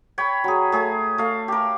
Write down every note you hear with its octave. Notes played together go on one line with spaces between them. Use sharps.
C#5 G5 B5
F#3 G#4
A3 G#4 C#5
A3 F5
G4 A#4